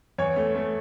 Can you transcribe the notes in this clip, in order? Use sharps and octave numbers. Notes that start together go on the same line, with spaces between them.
E2 C#5
A3
A3